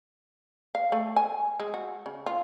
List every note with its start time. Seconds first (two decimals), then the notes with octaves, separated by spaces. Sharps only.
0.75 F5
0.92 A3
1.16 G#5
1.60 G#3
1.74 F#4
2.06 C#3
2.26 F4